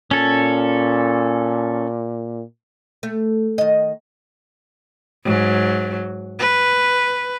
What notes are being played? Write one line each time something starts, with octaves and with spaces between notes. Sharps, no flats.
A#2 C#4 A4
A3
D#3 D#5
G#2 F#3
B4